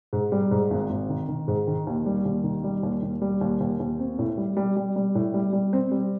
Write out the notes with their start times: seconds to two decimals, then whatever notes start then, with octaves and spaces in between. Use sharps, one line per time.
0.13 G#2
0.32 G3
0.51 G#2
0.70 G#1
0.90 G#1
1.09 D#3
1.28 D#3
1.48 G#2
1.67 D#3
1.87 D#2
2.06 G3
2.25 D#2
2.44 D#3
2.64 G3
2.83 D#2
3.02 D#2
3.22 G3
3.41 D#2
3.60 D#2
3.80 D#2
3.99 C4
4.19 A2
4.37 G3
4.57 G3
4.76 G3
4.96 G3
5.15 A2
5.34 G3
5.53 G3
5.73 C4
5.91 G3